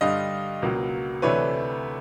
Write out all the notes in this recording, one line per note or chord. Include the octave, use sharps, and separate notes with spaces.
G2 D3 G3 D#5 F5
C#2 B2 F#3 A#3
D2 C3 E3 A3 D4 B4 C#5